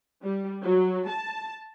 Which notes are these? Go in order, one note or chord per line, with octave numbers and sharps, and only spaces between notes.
G3
F#3
A5